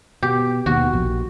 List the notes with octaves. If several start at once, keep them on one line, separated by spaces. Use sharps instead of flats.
B2 G4
D#2 B2 F#4
A#1 A#2